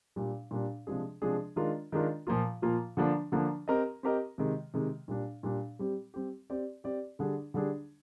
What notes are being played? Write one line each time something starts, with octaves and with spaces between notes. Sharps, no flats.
A#2 G3 D4
A#2 G3 D4
C3 F3 G#3 D4 G#4
C3 F3 G#3 D4 G#4
D#3 G#3 D4 F4 A#4
D#3 G#3 D4 F4 A#4
A#2 F3 A#3 F4
A#2 F3 A#3 F4
D3 F3 A#3 D4
D3 F3 A#3 D4
C4 G4 A#4 D#5
C4 G4 A#4 D#5
C3 D#3 G#3
C3 D#3 G#3
A#2 G3 D4
A#2 G3 D4
G3 C4 G4
G3 C4 G4
C4 G4 D5
C4 G4 D5
D3 G3 D4 G#4
D3 G3 D4 G#4